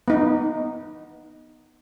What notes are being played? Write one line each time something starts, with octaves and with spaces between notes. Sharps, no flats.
B3 D#4